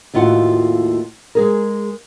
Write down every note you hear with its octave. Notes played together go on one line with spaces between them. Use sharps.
D#2 A2 F4 F#4 F#5
G#3 G#4 A#4